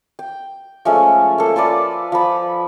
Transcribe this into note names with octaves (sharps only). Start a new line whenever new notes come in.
G5
F3 G#3 A3 C#4
A#3 A4
F4 A4 B4 D5
F3 B5